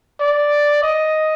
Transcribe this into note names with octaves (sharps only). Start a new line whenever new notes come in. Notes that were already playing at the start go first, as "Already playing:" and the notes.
D5
D#5